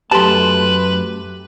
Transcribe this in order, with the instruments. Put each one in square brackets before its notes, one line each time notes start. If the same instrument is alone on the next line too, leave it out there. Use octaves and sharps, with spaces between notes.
[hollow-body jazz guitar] F#2 A5 [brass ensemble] A3 [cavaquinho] G4 C6 [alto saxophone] B4